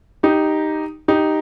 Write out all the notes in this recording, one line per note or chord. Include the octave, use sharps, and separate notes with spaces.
D#4 G4
D#4 G4